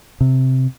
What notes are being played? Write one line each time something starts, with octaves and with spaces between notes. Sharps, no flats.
C3